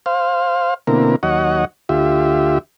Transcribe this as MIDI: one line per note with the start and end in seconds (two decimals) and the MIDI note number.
0.06 0.74 72
0.06 0.74 77
0.87 1.16 47
0.87 1.16 50
0.87 1.16 58
0.87 1.16 60
0.87 1.16 64
0.87 1.16 70
1.23 1.65 39
1.23 1.65 54
1.23 1.65 73
1.23 1.65 75
1.23 1.65 78
1.89 2.59 38
1.89 2.59 65
1.89 2.59 67
1.89 2.59 76